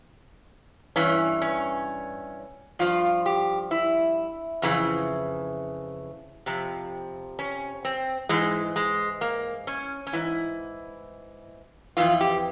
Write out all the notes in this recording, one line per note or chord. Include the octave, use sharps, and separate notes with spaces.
G2 E3 C#4
C#4
G2 F3 F4
G4
E4
F2 C#3 E3
F2 C3 F3
C#4
C4
G#2 E3 G#3
G#3
A#3
C#4
C#4
G#2 E3 E4
F2 E3 F4
G4